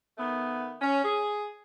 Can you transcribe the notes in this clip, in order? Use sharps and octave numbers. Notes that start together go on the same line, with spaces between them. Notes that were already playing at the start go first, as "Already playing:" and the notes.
D#3 A3 B3
C#4
G#4